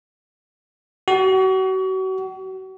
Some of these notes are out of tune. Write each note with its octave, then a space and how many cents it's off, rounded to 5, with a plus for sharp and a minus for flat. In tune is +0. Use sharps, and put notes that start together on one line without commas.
F#4 +35